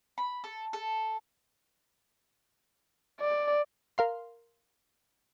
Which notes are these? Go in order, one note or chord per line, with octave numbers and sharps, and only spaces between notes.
B5
A4
A4
D5
A#4 F5 C6